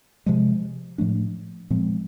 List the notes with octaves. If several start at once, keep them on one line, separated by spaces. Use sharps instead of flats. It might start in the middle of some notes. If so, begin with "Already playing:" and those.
C3 F3 G#3
A2 F3 A3 D4
A#2 F3 G#3 C4